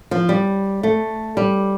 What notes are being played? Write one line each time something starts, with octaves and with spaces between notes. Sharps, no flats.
F3
G3
A3
G3